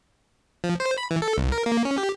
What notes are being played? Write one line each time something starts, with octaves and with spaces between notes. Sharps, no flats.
F3
C5
B5
E3
A4
C2
A#4
A#3
C#4
G4